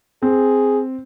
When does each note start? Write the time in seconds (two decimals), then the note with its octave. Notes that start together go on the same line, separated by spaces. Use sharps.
0.22 C4 G#4